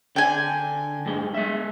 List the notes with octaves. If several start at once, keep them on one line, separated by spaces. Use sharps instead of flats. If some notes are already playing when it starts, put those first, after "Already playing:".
D3 D4 G5 G#5
G2 G#3
G#3 E5